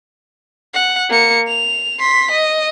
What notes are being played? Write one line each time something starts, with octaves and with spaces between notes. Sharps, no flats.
F#5
A#3 C#7
F7
C6 B6
D#5